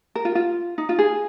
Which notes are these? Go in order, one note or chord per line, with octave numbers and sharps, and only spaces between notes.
A#4
F4
F4
D#4
F4
G#4